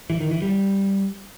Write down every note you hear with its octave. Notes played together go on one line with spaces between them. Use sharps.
E3
D#3
E3
G3